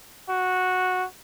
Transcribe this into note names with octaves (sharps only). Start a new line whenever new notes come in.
F#4